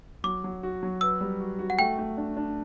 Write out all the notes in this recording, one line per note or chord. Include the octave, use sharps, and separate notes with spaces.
F#3 D6
F#3
F#4
F#3
B4 E6
G3
F#4
F#4
F#5
A3 G5
A3
D4
D4